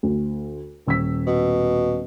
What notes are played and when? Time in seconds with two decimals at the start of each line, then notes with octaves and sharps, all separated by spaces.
0.03 D2
0.86 D#1 E6 B6
1.27 B2